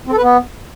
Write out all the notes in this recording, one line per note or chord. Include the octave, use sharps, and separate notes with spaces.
C4
A4
B4
B3